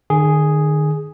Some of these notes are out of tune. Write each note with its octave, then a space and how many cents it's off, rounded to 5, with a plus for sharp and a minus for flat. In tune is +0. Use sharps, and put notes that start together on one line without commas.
D#3 -40 G#4 +0